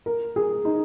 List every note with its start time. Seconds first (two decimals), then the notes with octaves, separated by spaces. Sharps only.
0.06 A#4
0.36 G#4
0.65 D#4